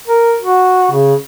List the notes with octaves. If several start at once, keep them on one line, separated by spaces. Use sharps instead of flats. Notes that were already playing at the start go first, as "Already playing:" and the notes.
A#4
F#4
C#3